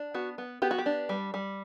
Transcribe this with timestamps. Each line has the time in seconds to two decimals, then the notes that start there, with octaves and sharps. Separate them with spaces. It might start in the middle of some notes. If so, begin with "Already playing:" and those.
Already playing: D4
0.14 B3 F#4
0.38 B3
0.62 B3 G4
0.71 F#4
0.78 G4
0.86 D4
1.09 G3
1.34 G3